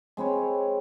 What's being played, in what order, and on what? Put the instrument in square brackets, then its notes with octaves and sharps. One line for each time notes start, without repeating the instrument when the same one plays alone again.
[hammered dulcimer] G#3 C4 B4 C#5